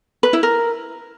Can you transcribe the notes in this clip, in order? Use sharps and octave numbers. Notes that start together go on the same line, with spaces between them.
B4
E4
A#4